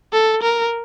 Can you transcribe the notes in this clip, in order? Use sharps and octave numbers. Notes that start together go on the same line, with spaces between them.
A4
A#4